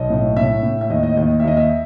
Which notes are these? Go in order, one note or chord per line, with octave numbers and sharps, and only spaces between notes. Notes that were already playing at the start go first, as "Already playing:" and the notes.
Already playing: B1 D#5
A2
A2 E5
A2
E5
D#2 D#5
D#5
D#2 D#5
E5
D#2 D#5
E5